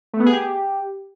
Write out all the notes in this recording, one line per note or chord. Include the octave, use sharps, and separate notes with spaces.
A3
B3
G#4
G4